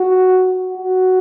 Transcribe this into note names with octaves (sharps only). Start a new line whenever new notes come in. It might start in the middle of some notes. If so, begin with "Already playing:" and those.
Already playing: F#4
F#4